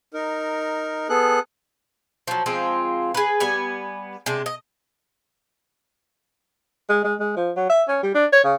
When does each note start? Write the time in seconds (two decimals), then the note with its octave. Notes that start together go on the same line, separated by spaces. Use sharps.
0.14 D#4 A#4
1.09 B3 G#4 A4 F#6
2.28 F3 F#3
2.46 F3 G#3 C4 F4
3.14 G#4 B4
3.40 G3 B3 G#5
4.26 C3 G#3 D4
4.46 D#5
6.90 G#3
7.04 G#3
7.20 G#3
7.37 F3
7.57 F#3
7.70 E5
7.88 C#4
8.03 G3
8.15 D4
8.33 C#5
8.44 C#3